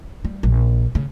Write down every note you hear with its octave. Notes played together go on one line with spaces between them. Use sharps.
G3
A#1
C#3